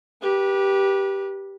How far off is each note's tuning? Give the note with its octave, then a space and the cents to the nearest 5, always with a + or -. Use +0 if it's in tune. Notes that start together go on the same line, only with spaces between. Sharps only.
G4 +0 B4 -30